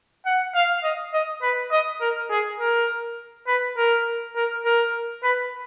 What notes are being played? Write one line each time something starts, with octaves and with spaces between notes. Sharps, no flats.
F#5
F5
D#5
D#5
B4
D#5
A#4
G#4
A#4
B4
A#4
A#4
A#4
B4